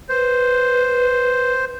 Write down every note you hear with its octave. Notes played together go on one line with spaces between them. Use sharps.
B4 C5